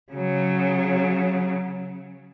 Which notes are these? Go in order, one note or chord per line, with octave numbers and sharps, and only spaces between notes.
C#3 F#3